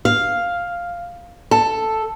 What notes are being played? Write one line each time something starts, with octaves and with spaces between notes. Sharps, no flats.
F5
A4